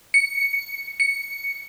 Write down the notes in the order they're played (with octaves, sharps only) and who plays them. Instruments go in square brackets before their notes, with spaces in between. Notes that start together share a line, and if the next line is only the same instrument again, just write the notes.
[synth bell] C#7
C#7